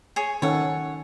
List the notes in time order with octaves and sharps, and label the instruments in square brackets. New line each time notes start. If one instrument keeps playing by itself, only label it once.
[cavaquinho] G#4 C#5
[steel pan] D#3 C#4 A4 [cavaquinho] C#5 F#5